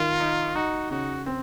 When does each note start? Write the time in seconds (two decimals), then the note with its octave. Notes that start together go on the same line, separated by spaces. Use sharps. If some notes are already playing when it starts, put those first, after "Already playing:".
Already playing: D#3 F4
0.20 D#4
0.56 D#4 F#4
0.91 C#3 F#4
1.26 C4